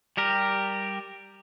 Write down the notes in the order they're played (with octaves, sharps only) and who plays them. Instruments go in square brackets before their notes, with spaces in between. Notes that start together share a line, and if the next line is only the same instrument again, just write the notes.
[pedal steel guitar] G3 G4 A#4